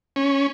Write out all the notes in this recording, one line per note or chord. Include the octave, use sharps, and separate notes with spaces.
C#4